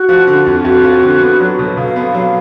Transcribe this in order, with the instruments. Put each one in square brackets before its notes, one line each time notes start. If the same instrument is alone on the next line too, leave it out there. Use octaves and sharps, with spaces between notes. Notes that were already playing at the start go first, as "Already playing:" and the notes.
Already playing: [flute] F#4
[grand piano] F3
D3
F2
[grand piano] F2 [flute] F#4
[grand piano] F3
D3
B3
F#3
B2
[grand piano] B2 [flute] F5
[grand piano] B3
F#3